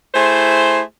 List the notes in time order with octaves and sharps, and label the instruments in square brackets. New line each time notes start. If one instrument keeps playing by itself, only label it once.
[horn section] A3 E4 G#4 C5